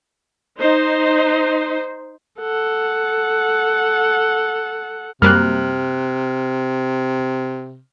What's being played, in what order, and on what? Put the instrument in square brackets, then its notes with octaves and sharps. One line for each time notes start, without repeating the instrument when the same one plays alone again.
[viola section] D#4 C5
[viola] A4 F#5
[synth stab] F#2 G3 A#3 [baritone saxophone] C3 [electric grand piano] F6 F#6